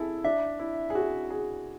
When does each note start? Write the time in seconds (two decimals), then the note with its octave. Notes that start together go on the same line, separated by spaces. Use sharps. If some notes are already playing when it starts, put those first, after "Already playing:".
Already playing: E4 G#4 A4
0.24 D4 E5
0.59 E4
0.90 G#4
0.95 F#4
1.30 G#4